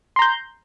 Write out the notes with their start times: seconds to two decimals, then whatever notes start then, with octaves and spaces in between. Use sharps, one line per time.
0.16 C6
0.19 A#5
0.22 G6